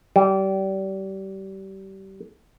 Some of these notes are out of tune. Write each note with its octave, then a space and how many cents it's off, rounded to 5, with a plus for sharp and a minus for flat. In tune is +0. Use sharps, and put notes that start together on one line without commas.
G3 -30